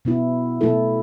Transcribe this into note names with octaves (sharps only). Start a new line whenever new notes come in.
B2 B3 E4
B2 A3 E4 A4